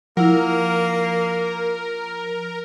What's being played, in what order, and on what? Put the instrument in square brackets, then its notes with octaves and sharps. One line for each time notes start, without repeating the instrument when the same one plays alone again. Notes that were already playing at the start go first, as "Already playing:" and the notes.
[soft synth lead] F3 [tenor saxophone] A#3 [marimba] E4 F#5 [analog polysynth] A#4